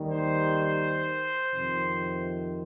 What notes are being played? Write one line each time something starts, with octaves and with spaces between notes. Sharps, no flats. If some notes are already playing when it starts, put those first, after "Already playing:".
Already playing: D#2 D#3 G3
C5
F2 C3 D#3